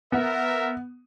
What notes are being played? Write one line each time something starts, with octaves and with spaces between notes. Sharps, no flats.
B3 A#4 E5